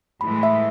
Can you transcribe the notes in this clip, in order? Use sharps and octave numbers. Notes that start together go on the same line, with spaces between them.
A2 E3 G#3 B5
E5